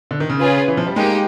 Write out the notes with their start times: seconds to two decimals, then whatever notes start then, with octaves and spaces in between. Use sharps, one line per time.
0.11 D3
0.20 D#3
0.29 C#3
0.40 C#4 F4 G#4 B4
0.68 E3
0.77 F3
0.87 G3
0.96 G#3 A#3 D#4 G4